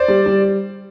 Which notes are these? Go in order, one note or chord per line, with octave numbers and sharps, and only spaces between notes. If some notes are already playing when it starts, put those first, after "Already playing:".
Already playing: C5 D5
G3
G3